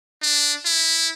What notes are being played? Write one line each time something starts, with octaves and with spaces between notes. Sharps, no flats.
D4
E4